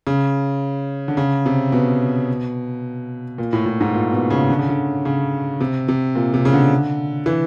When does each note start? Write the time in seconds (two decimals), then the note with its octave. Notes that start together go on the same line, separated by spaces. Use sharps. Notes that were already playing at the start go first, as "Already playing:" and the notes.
0.07 C#3
1.08 D3
1.17 C#3
1.46 C3
1.72 B2
3.38 A#2
3.53 A2
3.66 A2
3.81 G#2
3.94 A#2
4.13 B2
4.30 C#3
4.50 D3
4.59 C#3
4.69 D3
5.05 C#3
5.60 C3
5.88 C3
6.15 A#2
6.34 C3
6.45 C#3
6.53 D3
7.26 E3